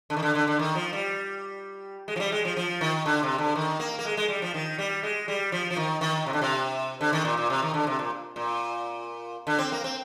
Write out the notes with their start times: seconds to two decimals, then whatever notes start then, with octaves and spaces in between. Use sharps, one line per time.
0.10 D3
0.17 D#3
0.22 D3
0.35 D3
0.47 D3
0.59 D#3
0.75 F3
0.93 G3
2.08 G#3
2.16 F3
2.20 G3
2.32 G#3
2.45 F3
2.57 F3
2.81 D#3
3.06 D3
3.23 C3
3.38 D3
3.55 D#3
3.80 A#3
3.99 A#3
4.05 G#3
4.17 G#3
4.28 G3
4.42 F3
4.54 D#3
4.78 G3
5.03 G#3
5.28 G3
5.52 F3
5.71 F3
5.77 D#3
6.01 D#3
6.26 C3
6.33 D3
6.42 C3
7.01 D3
7.13 D#3
7.25 A#2
7.37 A#2
7.50 C3
7.62 D#3
7.74 D3
7.87 C3
7.99 A#2
8.36 A#2
9.47 D3
9.58 C4
9.72 A#3
9.84 C4